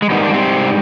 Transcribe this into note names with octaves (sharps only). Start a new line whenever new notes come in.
G#3
G#2 D#3 G3 B3
D4
C3 C4